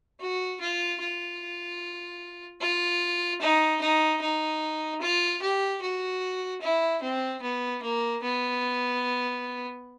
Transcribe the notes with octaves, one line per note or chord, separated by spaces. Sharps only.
F#4
F4
F4
F4
D#4
D#4
D#4
F4
G4
F#4
E4
C4
B3
A#3
B3